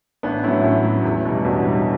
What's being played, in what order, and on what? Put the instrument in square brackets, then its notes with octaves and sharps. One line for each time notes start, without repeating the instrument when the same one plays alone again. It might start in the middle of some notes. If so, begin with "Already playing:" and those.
[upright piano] A1 B3 D4
A2 F#3 C#4 E4
A1 C#4 E4
A2 F#3
E2
B2 G3
E2 D4 F#4
B2 G3